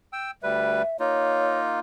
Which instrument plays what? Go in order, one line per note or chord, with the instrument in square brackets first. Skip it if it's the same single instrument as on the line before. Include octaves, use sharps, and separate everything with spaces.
[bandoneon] G5 E6
[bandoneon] D2 G3 B4 [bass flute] E5
[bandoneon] A#3 D#4 F4 [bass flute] C#5